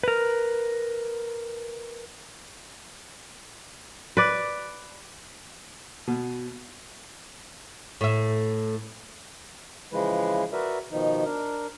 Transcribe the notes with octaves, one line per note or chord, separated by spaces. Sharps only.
A#4 B4
B4 D5
B2
A2 E5
C#3 E3 F3 G#3 E4 B4
F#4 A#4 B4 D5 E5
B2 D#3 F3 D#4
D4 A#4